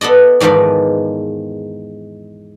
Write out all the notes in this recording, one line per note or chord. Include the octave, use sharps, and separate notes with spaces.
B3 A4 D5 D#5
E2 G#2 D#3 F3 B4 D5